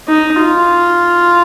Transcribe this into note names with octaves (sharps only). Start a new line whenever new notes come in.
D#4
F4